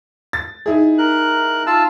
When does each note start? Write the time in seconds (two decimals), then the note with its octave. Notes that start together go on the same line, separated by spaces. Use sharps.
0.33 A6
0.66 D#4 E4 G#4
0.98 A#4 F#6
1.67 F4 A5 E6